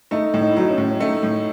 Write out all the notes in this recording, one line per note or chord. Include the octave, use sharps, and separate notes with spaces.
A3 D#4
A2
D#4
E4
F#3 D#4
C#4
A2
C#4
A3 D#4
A2